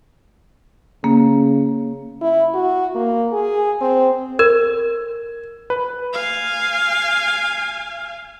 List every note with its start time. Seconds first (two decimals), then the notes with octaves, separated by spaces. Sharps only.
1.04 C#3 A#3
2.21 E4
2.54 F#4
2.95 A#3
3.32 G#4
3.81 C4
4.39 A#4 G#6
5.70 B4
6.14 F5 G#5